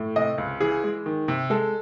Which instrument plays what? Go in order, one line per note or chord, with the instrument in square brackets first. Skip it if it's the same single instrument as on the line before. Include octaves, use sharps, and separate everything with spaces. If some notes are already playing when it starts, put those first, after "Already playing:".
Already playing: [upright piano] A2
C3 D#5
C#2
E3 G#4
G#3
D#3
C3
G#3 A4